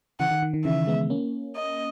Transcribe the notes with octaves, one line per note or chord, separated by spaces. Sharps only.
C#3 E3 F#5
D#3
D#3
D#3
C#3 E3 E5
G#3 B3
A#3 C#4
D#5